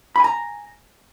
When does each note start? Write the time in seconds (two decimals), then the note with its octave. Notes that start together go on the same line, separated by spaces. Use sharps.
0.16 B5
0.20 G#5
0.24 A#5